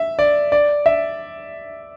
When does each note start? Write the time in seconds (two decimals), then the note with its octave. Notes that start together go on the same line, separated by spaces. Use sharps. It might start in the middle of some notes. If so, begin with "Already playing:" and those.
Already playing: E5
0.19 D5
0.52 D5
0.86 E5